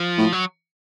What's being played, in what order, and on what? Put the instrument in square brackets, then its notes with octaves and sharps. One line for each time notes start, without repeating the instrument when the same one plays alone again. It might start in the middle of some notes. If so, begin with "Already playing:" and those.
Already playing: [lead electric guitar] F3
[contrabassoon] A2
[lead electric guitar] F#3